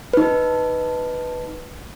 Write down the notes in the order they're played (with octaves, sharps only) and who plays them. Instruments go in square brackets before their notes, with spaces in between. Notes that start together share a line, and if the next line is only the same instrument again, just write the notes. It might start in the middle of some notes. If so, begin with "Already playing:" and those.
[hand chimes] D#4 B4